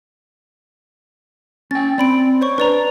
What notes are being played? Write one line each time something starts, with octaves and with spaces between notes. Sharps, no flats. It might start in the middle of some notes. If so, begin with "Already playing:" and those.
C#4 G5 A6
C4 D5 B5 D7
C5 C#5 C#6
D4 B4 D5 A#5